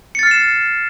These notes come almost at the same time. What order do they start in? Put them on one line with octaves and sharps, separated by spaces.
C#7 A6 F6 C7 E7